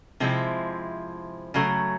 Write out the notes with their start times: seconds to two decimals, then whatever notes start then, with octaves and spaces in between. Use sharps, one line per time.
0.20 C3 F3 G#3 C4 E4
1.54 C#3 F#3 A3